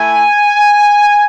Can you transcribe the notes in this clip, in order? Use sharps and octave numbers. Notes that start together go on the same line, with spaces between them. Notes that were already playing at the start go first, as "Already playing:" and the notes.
Already playing: A3 E4 G#5